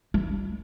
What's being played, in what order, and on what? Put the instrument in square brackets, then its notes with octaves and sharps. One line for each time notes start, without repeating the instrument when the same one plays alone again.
[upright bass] G3